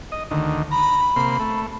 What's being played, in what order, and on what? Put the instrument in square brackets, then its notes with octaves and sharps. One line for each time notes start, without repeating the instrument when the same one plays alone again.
[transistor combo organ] D#5
D2 D#3
[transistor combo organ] A#5 [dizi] B5
[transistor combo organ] C3 A#3 C6
A3